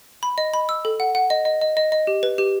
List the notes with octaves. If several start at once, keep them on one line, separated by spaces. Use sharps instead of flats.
B5
D#5
B5
E6
A4
F#5
F#5
D#5
D#5
D#5
D#5
D#5
G4
B4
G4